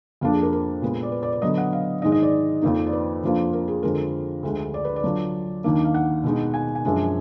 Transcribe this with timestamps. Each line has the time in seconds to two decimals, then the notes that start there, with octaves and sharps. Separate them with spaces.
0.21 F2 F3 A#3 D4 F5
0.33 G#4
0.42 A#4
0.53 A#4
0.82 A#2 G#3 B3
1.03 D5
1.12 B4
1.23 D5
1.33 D5
1.42 D3 F#3 B3 D#5
1.58 F#5
1.73 F5
2.02 G#2 D#3 G#3 D#4 D#5
2.12 D#5
2.23 D5
2.62 F2 F3 A#3 D#4
2.87 D5
2.93 B4
3.24 F2 F3 A#3 D4 F4
3.53 A#4
3.68 G#4
3.83 F2 D3 F3 G#3 A#4
4.43 D2 D3 G#3
4.74 D5
4.85 B4
4.96 D5
5.03 D3 F#3 D4 F4
5.64 D#2 D#3 A#3 D4
5.85 F5
5.94 F#5
6.24 B2 G#3 D#4
6.54 G#5
6.75 G#5
6.85 F#2 F3 G#3 D4